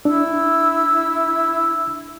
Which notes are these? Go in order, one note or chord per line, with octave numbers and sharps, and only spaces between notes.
D4 E4 E6